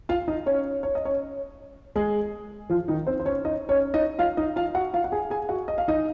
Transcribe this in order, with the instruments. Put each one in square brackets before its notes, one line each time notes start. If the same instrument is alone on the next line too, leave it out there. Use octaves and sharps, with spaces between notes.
[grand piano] F4 F5
D#4 D#5
C#4 C#5
C#5
D#5
C#4 C#5
G#3 G#4
F3 F4
D#3 D#4
C4 C5
C5
C#4 C#5
D#4 D#5
C#4 C#5
D#4 D#5
F4 F5
D#4 D#5
F4 F5
F#4 F#5
F4 F5
F#5
G#4 G#5
G#4 G#5
F#4 F#5
D#5
F5
D#4 D#5